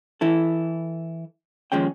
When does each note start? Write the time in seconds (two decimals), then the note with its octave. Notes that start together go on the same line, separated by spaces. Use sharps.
0.21 E3 E4 A4
1.72 D#2 F3 G#3 C#4 G5